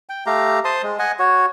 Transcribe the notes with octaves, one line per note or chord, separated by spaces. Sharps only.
G5
A3 G4 F5 A#5
C5 A5 C6 D#6
G#3
D#5 F#5 G#5
F#4 C#5